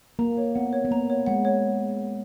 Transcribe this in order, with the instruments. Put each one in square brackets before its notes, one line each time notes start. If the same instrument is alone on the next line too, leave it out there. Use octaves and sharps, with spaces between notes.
[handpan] A#3 [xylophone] A#5
[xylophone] C#5
[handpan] B3 [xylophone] F#5
[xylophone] C#5
[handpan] B3
[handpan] A#3 [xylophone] A#5
[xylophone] C#5
[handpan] G#3 [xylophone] F#5
[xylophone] C#5